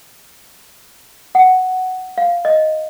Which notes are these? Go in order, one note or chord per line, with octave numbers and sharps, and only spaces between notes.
F#5
F5
D#5